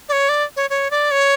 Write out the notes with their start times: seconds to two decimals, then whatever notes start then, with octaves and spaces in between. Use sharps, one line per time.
0.09 D5
0.12 C#5
0.29 D5
0.56 C#5
0.70 C#5
0.91 D5
1.11 C#5